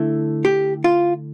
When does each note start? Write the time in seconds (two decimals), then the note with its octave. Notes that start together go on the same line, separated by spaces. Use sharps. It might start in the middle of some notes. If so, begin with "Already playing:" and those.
Already playing: D3 A3 E4
0.45 G4
0.84 F4